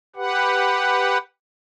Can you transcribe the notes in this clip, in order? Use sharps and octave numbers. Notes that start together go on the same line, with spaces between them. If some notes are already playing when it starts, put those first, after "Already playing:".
G4 B4 F#5